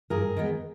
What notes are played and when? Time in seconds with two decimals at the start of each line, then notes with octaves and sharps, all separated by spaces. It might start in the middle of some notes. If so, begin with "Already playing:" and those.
0.10 G2 G#4 A#4
0.37 D#3 G#3 B3